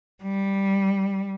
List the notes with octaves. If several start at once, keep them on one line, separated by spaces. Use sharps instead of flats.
G3